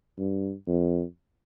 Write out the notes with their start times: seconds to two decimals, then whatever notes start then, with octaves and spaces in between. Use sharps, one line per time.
0.18 G2
0.68 F2